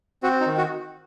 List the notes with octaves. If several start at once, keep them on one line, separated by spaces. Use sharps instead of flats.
C4 F#4
D#4
D#3
F#4